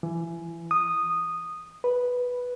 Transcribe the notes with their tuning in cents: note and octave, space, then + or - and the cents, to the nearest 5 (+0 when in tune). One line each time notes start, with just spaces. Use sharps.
E3 +25
D#6 -10
B4 -5